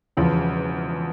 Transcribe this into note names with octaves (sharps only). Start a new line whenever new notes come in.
E1 E2 C#3 F3